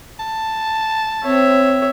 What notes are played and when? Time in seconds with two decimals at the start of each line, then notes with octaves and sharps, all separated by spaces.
0.20 A5
1.24 C4 C#5 E5